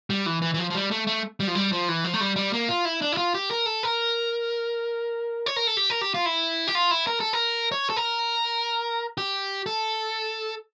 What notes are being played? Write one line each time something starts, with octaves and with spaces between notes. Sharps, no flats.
G3
E3
E3
E3
F3
F3
G3
A3
A3
G3
F3
G3
F3
E3
F3
A3
G3
G3
A#3
F4
E4
D4
E4
F4
G4
A#4
A4
A#4
C#5
A#4
A4
G4
A#4
G4
F4
E4
G4
F4
E4
A#4
A4
A#4
C#5
A4
A#4
G4
A4